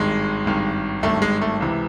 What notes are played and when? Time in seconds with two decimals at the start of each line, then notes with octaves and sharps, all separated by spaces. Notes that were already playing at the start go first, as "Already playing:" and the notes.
Already playing: G#1 G2 D#3 G#3
0.46 G#1 G2 D#3
1.03 G#1 G2 D#3 A3
1.22 G#3
1.41 A3
1.60 C#2 C3 E3